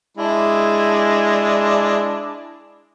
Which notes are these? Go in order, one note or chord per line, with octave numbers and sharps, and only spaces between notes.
G#3 D4 E4